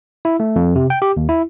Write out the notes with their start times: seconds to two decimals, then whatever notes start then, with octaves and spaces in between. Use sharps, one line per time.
0.25 E4
0.40 A3
0.56 F2
0.76 C3
0.90 G5
1.02 G4
1.17 D#2
1.29 E4